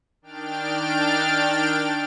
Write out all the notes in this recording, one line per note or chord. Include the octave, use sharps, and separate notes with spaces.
D#3 D4 G5 F6 A6 D7